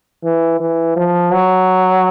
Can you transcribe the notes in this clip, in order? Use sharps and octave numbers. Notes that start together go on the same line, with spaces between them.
E3
E3
F3
F#3